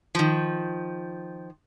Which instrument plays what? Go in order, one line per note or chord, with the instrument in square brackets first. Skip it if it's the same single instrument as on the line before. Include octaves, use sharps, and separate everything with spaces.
[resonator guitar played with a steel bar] D#3 F3